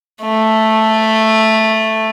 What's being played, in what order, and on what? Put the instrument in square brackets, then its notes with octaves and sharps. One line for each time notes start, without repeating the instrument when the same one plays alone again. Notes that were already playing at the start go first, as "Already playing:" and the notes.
[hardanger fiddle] A3